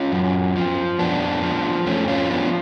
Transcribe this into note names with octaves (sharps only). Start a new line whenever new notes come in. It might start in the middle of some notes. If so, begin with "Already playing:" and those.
Already playing: C#4 F4
F#2
F3
F2 B3 D4
F3
F2 A3 C#4
C#4 F4
F3 B3 D4